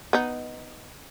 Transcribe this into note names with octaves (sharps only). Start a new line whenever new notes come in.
B3 D#4